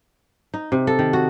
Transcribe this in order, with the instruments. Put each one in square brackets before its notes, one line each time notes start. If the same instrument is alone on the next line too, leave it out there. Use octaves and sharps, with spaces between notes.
[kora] D#4
C3
A4
D#3
F#4